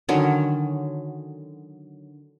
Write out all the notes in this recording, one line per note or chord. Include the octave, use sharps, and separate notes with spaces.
D3 D#3 F#3 C#4